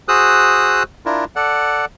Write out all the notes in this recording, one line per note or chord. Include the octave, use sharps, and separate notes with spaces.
F#4 G#4 C5 D#6 E6 F#6
D4 E4 F4 A#4
A4 D5 F#5